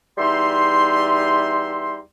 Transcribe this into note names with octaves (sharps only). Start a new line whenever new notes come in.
E2 G3 D#4 E5 C6